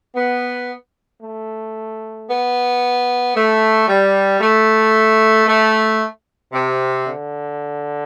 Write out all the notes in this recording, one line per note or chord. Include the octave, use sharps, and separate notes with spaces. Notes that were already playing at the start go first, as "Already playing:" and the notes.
B3
A3
B3
A3
G3
A3
A3
C3
D3